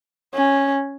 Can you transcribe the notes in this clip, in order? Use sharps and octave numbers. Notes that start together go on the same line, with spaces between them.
C#4